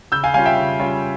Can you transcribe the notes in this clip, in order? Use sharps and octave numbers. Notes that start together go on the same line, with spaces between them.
C#3 E6 G6
F5 G#5
G3 C#4 F4 F5 G#5
E5 G5
C#3
G3 C#4 F4